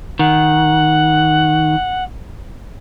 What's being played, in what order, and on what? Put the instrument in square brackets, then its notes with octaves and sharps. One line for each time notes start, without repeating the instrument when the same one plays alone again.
[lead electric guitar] D#3 [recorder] F#5